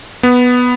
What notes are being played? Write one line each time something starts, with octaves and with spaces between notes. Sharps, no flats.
B3